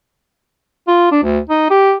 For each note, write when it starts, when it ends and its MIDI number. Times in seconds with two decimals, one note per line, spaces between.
0.87 1.09 65
1.11 1.20 62
1.23 1.39 38
1.49 1.69 63
1.70 1.94 67